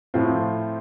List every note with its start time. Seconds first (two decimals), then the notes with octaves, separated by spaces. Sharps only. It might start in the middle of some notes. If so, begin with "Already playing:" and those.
0.14 A2 F3 C4 F4